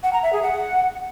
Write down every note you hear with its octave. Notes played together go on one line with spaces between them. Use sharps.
F#5
A#5
E5
G#4
F#5